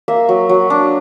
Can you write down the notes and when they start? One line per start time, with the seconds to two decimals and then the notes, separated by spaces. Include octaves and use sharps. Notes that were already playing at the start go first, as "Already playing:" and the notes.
0.08 A#3 E5
0.29 F#3
0.49 F#3
0.70 D4